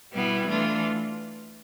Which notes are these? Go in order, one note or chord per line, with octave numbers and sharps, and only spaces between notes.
B2 G3 B3 E4
E3 A3 D4 F4